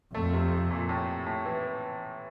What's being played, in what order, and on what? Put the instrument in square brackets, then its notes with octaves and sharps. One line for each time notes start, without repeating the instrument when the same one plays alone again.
[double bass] F2 [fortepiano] A3
[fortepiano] C3
A#2
A2
A2
E3